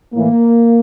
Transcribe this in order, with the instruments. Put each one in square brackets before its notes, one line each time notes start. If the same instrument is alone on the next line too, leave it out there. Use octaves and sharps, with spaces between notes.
[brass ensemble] A2 E3 A#3